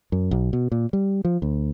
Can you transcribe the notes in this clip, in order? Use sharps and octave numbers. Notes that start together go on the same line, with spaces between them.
F#2
B1
B2
A#2
G3
F3
D2